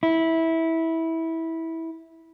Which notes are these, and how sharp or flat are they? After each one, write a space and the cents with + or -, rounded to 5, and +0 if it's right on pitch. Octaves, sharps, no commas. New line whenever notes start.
E4 -15